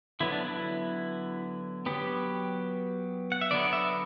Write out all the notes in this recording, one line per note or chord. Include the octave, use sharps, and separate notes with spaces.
D3 F#3 B3 E4
D4
E4
F#3 B3 G4
F#5
E5
D3 F#3 B3 D5
E5